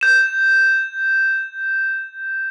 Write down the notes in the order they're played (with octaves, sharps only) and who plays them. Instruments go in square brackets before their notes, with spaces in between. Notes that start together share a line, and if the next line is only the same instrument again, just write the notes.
[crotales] G6 E7